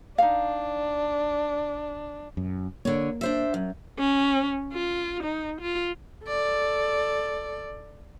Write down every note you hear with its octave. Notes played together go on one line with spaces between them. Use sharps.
D4 D#4 F5
F#2
D3 A#3 C#5
D4 C5 E5
F#2
C#4
F4
D#4
F4
A4 D5